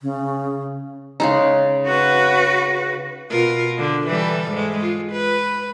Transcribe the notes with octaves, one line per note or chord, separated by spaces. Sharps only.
C#3
C#3 G#3 D#4
F#4 B4
B2 F4 A#4
D3
E3 G3 A4
G#2 G#3
F4
B4